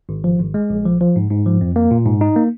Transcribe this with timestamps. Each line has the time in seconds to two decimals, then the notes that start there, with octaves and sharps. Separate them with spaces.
0.09 G#1
0.24 F3
0.39 G#1
0.54 G#3
0.70 A#1
0.85 F3
1.01 F3
1.16 G#2
1.31 G#2
1.46 F3
1.61 F2
1.76 A#3
1.91 A#2
2.06 G#2
2.21 D#4
2.36 A#3